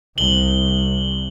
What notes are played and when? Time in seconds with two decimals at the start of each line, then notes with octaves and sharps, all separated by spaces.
0.18 C2 F#7 G7